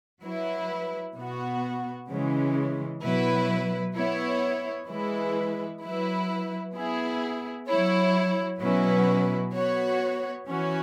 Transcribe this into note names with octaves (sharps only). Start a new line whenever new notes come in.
F#3 E4 B4
B2 B3 F#4
C#3 E3 G#3 C#4
B2 F#3 E4 B4
B3 E4 C#5
E3 G#3 E4 B4
F#3 E4 B4
B3 E4 G#4
F#3 E4 C#5
B2 F#3 C#4 E4 B4
B3 F#4 C#5
E3 C#4 F#4 C#5